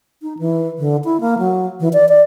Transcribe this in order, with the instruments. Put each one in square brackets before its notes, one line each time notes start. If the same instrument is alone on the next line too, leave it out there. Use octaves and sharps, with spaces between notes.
[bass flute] D#4
E3
D3
E4
A#3
F#3
E3
D5
D5